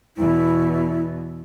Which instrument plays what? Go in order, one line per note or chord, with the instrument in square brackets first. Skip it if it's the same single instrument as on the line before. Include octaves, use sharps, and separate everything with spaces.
[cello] E2 B2 [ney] E4